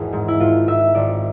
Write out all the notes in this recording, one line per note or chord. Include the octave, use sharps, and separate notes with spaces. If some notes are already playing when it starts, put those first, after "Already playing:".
Already playing: G#1 E2 E3 G#4
G#2
E4
G#1 F4
G#2 E5
G#1 D5